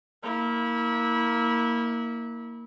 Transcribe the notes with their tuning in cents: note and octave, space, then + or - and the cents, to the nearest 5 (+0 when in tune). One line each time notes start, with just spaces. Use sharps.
A#3 +0 E4 -25